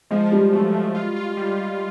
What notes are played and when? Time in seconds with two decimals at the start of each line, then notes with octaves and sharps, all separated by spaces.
0.11 F3 G#3
0.32 F3 G3
0.53 F#3 A3
0.74 A3
0.95 F4
1.16 F4
1.37 G3
1.58 G3